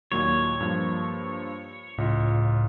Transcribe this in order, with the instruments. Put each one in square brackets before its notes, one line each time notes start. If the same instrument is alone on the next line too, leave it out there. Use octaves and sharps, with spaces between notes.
[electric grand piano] D#2 A#2 F#3 [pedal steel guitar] C#5
[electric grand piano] G2 F3 A#3
[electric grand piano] C#2 F4 [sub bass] A2